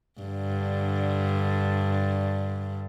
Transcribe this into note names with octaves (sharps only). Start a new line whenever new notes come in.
G2 D3